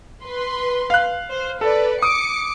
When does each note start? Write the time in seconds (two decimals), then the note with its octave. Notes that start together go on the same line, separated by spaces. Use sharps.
0.24 B4 C6
0.90 F5 F#6
1.30 C5
1.61 A4 B4 D5
2.02 D6 D#6 C#7